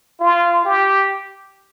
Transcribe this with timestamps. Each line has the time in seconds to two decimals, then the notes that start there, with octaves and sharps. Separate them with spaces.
0.20 F4
0.65 G4